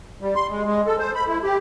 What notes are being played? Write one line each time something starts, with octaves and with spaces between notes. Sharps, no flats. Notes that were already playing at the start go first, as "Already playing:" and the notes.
G3
C6
G#3
G#3
A4
C5
B5
E4
G4